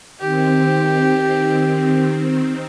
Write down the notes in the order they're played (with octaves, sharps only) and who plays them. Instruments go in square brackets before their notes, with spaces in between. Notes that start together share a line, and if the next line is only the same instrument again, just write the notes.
[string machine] D#3 C4 [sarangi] G4